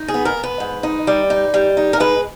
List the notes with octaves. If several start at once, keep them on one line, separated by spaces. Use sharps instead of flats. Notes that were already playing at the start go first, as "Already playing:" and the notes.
Already playing: D#4
G#4
B3
A#4
B3
B4
G#2
D#4
G3
D#4
G3
D#4
A#4
G#3 B4